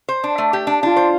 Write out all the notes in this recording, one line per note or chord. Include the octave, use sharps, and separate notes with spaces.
C5
D4
A3
G4
D4
D4 F4
C5